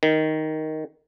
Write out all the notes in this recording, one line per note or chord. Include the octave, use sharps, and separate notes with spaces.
D#3